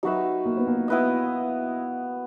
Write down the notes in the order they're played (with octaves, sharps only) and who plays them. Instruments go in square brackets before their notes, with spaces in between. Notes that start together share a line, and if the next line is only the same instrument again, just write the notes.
[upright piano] F#3 [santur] D#4 F#4 B4 E5
[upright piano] A#3
B3
A#3
[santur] B3 E4 B4 D#5